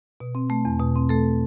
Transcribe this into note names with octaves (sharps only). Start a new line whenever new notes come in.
B2
C4
A3
E2
B2
C4
A3 A4